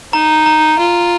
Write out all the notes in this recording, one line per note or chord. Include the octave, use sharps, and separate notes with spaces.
D#4 A#5
A#5
F4